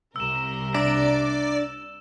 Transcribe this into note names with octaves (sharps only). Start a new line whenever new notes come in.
C2 C3 A#4 E6 E7
D4 D5 E5 A#5